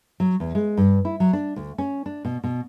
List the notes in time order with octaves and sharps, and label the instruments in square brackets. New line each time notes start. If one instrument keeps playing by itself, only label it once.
[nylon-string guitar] F#3
E2
G#3
G2
E4
F#3
D4
D2
C#4
D4
B2
B2